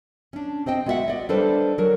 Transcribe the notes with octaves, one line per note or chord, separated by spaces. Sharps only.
C#4 D4
C4 C5 D#5 G5
G#3 B3 F#4 D5 E5 F#5
D5 D#5
G3 D4 A4 B4 C5
F#3 A#4